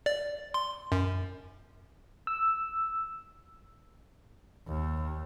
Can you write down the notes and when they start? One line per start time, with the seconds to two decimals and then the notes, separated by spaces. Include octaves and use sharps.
0.06 D5
0.54 C6
0.92 F#2
2.27 E6
4.68 D#2